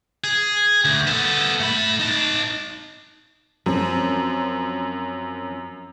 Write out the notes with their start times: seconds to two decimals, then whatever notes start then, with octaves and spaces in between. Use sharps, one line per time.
0.24 G#4
0.85 D2
1.07 B3 A4
1.60 A3 B5
2.00 D#4 A5
3.66 F#2 F3 C4